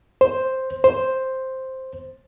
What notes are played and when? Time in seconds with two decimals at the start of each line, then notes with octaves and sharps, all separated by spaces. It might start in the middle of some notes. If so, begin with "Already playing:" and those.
0.21 C5
0.84 C5